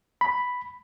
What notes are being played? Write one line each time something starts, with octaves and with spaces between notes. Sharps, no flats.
B5